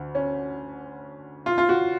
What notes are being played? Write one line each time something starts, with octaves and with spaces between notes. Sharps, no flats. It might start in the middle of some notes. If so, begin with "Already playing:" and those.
Already playing: D2 D3
C#4
F4
F4
F#4